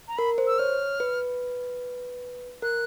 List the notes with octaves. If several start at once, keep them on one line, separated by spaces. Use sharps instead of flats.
A#5
A#4 B5
C5
E6
C#5 F6
B4
A#4 F#6